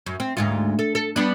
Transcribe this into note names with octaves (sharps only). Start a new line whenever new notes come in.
F#2
C4
D2 G#2 F4
A4
A4
G3 B3 D4